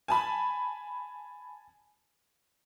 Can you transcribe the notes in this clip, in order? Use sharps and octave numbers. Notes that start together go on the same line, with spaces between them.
G#5 A5 B5